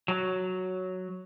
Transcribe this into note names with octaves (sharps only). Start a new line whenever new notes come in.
F#3